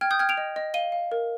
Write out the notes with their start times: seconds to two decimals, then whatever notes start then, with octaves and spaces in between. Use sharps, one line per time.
0.01 G5 F6 G#6
0.11 D#6 G6
0.19 G5 F6 G#6
0.29 D7 F7
0.37 D#5
0.56 D#5
0.74 F5 D#7 G7
0.92 F5
1.12 A#4